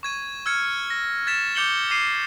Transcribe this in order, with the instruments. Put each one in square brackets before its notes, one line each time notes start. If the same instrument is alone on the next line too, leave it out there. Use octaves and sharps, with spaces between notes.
[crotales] C#6 G#6 D#7
E6 F6 G#6 C#7
A#6
G#6 A6 B6 E7
D6 G6 C#7 F#7 G7
D6 C7 D#7